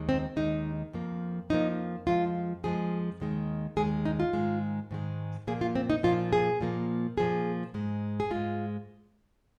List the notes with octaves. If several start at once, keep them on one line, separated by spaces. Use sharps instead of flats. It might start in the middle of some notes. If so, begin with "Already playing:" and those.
Already playing: D#2 D#3 G#3
C4
D#2 D#3 G#3 D#4
F2 F3 A#3
F2 F3 A#3 D#4
F2 F3 G#3 F4
F2 F3 G#3 G#4
D#2 D#3 G#3
D#2 D#3 G#3 G#4
D#4
F4
G#2 D#3 G#3
G#2 D#3 G#3
A#2 F3 A#3 G#4
F4
C4
D#4
A#2 F3 A#3 F4
G#4
A#2 F3 A#3
A#2 F3 A#3 G#4
G#2 G#3
G#4
G#2 G#3 F4